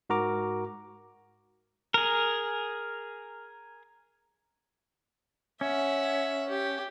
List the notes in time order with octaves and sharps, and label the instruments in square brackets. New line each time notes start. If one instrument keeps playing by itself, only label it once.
[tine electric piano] G#2 F#4 A#4 A#5 D6
[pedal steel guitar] G#4 A#4
[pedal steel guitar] C#4 [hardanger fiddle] E5 F#5
[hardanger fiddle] G4